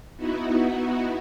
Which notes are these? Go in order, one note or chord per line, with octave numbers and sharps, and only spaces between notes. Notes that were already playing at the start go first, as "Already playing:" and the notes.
B3 D#4 E4 F#4